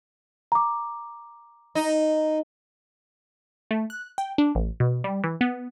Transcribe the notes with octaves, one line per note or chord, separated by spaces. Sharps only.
A#5 D6
D#4
A3
F#6
G5
D4
A1
B2
G3
E3
B3